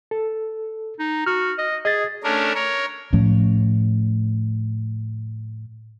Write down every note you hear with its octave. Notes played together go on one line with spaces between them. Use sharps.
A4
D#4
F#4 F6
D#5
G#4 D#5 A6
A3 C#4 D4 A#4
A#4 C#5
A2 F3 A3 C#4